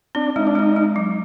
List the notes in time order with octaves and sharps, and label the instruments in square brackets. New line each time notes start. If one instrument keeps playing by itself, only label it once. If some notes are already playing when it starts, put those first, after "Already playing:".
[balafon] C4 [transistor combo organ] D4
[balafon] G#3 [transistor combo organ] D#4
[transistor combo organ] D4
[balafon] G#3 [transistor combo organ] D#4
[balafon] G#3
F#3